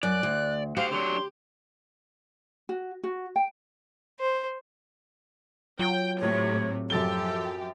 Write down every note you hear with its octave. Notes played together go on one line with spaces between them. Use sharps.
F#2 D5 F#6
D2
F#4 G4 C5 F5
D3 F#3 D4 C6
F#4
F#4
G5
C5
F#3 F4 G5
A2 C3 C#5
F#2 F3 G4 A4 A6 G7